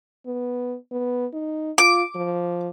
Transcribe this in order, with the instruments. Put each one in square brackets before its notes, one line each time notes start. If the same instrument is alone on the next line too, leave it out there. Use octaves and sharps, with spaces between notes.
[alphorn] B3
B3
D#4
[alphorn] F4 [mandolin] D6
[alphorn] F3